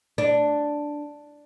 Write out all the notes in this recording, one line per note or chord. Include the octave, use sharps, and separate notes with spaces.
D4